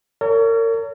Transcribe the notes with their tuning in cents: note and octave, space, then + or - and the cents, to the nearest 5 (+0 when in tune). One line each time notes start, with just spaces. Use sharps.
A#4 -35 C#5 +35